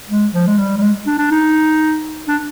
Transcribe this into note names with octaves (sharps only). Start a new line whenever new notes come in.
G#3
F3
G#3
G3
G3
G#3
D4
D4
D#4
D4